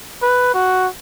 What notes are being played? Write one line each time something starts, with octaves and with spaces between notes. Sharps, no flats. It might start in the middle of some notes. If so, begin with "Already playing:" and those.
B4
F#4